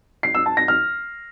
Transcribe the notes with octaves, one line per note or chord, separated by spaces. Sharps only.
C7
E6
A5
A#6
F6